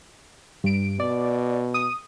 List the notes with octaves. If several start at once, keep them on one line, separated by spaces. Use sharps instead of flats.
G2 D7
B2 D5
D#6